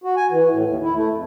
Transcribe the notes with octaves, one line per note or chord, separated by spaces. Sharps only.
F#4
G#5
E3
A2
D#2
E4
A3
F2